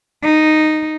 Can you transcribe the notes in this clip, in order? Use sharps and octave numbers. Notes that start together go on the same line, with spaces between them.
D#4